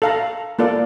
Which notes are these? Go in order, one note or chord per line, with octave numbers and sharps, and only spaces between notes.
A4 F5 A#5
A#3 F4 A4 D5